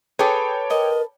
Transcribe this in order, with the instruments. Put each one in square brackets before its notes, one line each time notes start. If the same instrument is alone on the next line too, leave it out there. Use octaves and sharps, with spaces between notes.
[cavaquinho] G#4 C#6 [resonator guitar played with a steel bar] A4 B4 [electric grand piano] C#5 G5 D6
[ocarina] A#4 [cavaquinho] D#5